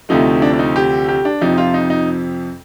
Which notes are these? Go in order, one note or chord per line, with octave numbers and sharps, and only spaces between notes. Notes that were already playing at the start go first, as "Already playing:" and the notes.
D2 C3 F3 A3 D#4
D4
D4
D#4
G4
G4
D4
F2 C3 F3 D#4
F4
D#4
D#4